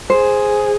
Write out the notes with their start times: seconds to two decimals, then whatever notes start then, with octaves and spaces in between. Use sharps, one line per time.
0.10 G#4 C5